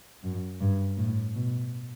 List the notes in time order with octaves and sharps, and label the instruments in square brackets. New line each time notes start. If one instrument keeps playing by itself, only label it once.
[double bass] F#2
G2
A2
B2